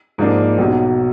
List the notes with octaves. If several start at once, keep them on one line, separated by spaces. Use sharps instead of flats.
G#2 F3 A#3 D4
B1 B2 F#3